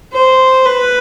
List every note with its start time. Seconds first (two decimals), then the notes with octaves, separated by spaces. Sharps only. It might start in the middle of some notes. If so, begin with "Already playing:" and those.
0.14 C5
0.65 B4